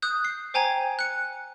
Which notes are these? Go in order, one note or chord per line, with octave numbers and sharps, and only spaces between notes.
D#6 F#6 G6
C7
C5 G5 G#5 A#5 G#6
F#6 C#7